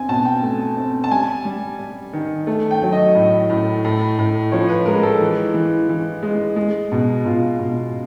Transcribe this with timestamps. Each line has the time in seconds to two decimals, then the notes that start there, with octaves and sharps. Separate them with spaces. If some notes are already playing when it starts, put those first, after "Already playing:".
Already playing: C4 G#5
0.09 B2 A5
0.25 G5
0.43 A3
0.77 C4
1.04 A5
1.11 G3 G#5
1.45 G3
1.79 G3
2.13 D#3
2.47 A3
2.71 G5
2.82 F#3
2.92 D#5
3.15 A2
3.50 A2
3.84 A2
4.19 A2
4.52 F3 C#5
4.69 B4
4.86 G#3 A#4
5.03 A4
5.21 E3
5.54 E3
5.89 E3
6.23 G#3
6.56 G#3
6.92 B2
7.25 B2 F4
7.59 B2